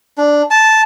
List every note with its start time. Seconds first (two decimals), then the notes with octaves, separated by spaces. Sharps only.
0.18 D4
0.51 A5